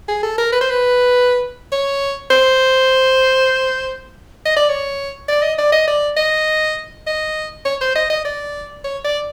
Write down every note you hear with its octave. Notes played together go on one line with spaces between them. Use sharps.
G#4
A4
A#4
B4
C5
B4
C#5
C5
D#5
D5
C#5
D5
D#5
D5
D#5
D5
D#5
D#5
C#5
C5
D#5
D#5
D5
C#5
D5